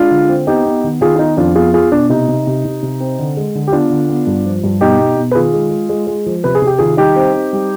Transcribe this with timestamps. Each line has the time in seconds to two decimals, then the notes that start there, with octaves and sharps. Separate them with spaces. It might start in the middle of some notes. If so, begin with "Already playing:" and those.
Already playing: G#3 D4 F4
0.11 D3
0.29 C4
0.47 B3 D#4 G4
0.66 B3
0.84 D#3
1.01 D#3 F4 G#4
1.16 F4
1.19 B3 D#4
1.37 F2 D4 F4
1.55 B3 F4 G#4
1.74 B3 F4 G#4
1.92 B2 D4
2.09 C3 D#4
2.28 C3
2.47 C3
2.65 C3
2.82 C3
3.00 C4
3.19 D3
3.37 G#3
3.55 D3
3.67 G4
3.72 B3 D4 F4
3.90 D3
4.09 B3
4.27 G2
4.45 F3
4.64 G2
4.81 B2 D#4 G4
5.00 B2
5.17 B2
5.31 B4
5.35 D#3 F4 G#4
5.54 G#3
5.71 G#3
5.89 G#3
6.07 G#3
6.26 F3
6.44 C3 B4
6.55 G#4
6.62 C3
6.67 G4
6.79 D#3 F4 G#4
6.97 G3 D#4 G4
7.16 C4
7.33 C4
7.53 G3